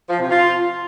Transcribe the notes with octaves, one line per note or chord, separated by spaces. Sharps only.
F3
C3
F4